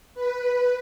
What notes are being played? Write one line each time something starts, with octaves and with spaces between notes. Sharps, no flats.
B4